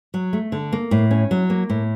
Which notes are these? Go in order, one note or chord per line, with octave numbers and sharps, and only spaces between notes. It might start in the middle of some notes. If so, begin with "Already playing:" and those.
F#3
A3
D3
A#3
A2
C#4
F#3
A#3
A2